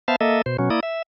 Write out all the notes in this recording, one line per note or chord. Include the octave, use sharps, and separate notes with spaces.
B3 C5 E5 F5 A5
A#3 A4 D#5 E5
B2 C5
B2 F#3 C#4
A#3 E4 D5 D#6
E5